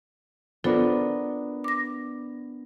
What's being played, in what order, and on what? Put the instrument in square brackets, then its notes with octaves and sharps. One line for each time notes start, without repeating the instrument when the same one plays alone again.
[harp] B3 D4 A#4 [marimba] F4 A4 C5
[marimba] D6 A#6